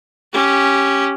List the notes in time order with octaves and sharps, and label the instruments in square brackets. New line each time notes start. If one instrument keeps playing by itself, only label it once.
[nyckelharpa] C#4 G4